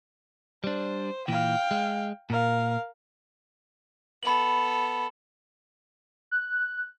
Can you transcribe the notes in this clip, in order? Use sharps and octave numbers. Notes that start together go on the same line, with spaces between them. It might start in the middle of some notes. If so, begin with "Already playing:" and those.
G3 D4 C5
A#2 E3 F5 G5
G#3
A#2 A#4 F5
B3 A4 B5 F#7
F#6